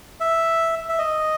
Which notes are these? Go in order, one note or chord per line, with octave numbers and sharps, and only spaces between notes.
E5
E5
D#5